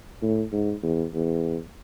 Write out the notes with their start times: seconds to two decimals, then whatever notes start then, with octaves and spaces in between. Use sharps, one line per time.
0.22 A2
0.52 G#2
0.83 E2
1.14 E2